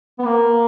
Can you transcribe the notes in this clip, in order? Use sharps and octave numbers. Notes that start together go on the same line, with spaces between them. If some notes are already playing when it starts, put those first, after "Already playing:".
B3
A#3